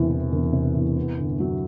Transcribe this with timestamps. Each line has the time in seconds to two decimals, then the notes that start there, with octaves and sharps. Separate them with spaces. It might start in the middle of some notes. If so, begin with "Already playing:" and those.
Already playing: E1 E2 C3 E3
0.10 E3
0.32 E1
0.53 C3
0.74 E2
0.97 B3
1.18 G1
1.40 F#3